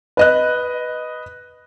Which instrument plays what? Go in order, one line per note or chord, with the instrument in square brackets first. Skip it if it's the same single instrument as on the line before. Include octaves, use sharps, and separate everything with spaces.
[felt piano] B4 D#5 F#6